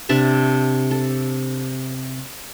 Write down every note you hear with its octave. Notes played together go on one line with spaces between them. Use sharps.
C3 D4 E5 A5
A4